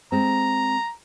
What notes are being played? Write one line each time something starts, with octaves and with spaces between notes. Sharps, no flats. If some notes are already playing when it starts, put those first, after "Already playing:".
G#3 C4 A#5